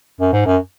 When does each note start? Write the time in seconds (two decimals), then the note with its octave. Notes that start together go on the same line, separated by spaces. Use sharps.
0.21 F#2
0.33 G#2
0.46 F#2